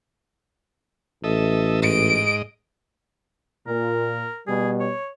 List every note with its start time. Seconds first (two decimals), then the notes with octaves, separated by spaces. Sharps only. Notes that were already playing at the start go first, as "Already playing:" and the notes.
1.24 A1 A4 D#5 E5
1.83 G#2 D#5 D7
3.67 A#2 A#4
4.47 B2 G3 G#4
4.80 C#5